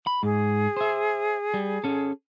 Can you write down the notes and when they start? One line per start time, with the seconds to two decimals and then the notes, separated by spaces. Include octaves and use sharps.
0.07 B5
0.23 G#2 G#4
0.77 C5 E5
1.54 G3
1.84 C#4 A4